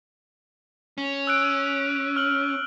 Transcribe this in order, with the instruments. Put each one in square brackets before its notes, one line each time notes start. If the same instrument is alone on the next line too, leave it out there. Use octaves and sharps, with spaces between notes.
[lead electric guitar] C#4
[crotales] E6 F#6 D7
F6 F#7